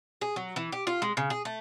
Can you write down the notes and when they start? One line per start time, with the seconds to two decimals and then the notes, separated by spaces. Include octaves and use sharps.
0.21 G#4
0.36 F#3
0.56 E3
0.72 G4
0.87 F4
1.02 G#3
1.17 C#3
1.30 G#4
1.45 A3